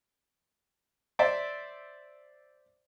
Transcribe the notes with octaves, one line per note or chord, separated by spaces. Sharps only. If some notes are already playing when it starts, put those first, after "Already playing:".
C5 D5 E5